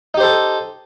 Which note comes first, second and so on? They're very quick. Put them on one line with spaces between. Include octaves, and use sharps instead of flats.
D#4 G4 C5 A4